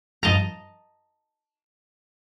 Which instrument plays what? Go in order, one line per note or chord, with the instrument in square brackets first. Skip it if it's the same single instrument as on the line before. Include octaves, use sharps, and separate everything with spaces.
[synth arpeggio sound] G2 F3 [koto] D#5 A5 A#5